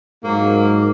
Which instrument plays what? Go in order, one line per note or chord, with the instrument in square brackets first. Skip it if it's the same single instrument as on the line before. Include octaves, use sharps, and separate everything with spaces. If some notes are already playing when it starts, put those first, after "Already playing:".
[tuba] G#2 [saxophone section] F#3 A#3